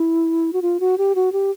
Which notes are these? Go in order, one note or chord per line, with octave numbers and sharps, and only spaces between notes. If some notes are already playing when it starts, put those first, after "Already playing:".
Already playing: E4
F#4
F4
F#4
G4
F#4
G4